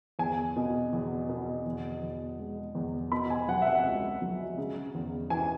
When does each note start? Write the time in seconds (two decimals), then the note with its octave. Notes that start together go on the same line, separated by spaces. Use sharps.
0.19 E2 G#5
0.56 B2
0.93 E2
1.29 B2
1.66 E2
2.02 E2
2.39 G#3
2.75 E2
3.12 B2 B5
3.30 G#5
3.48 F#3 F#5
3.62 E5
3.67 F#5
3.84 C#2
4.22 F#3
4.58 C#3
4.95 E2
5.30 E3 G#5